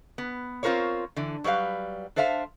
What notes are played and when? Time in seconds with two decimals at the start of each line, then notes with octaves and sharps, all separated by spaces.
0.18 B3
0.63 C4 F4 F#4 A#4 C5 C#5
1.16 D3 E3
1.44 F#3 G3 B4 C#5 F5
2.16 D4 A4 C5 E5 F5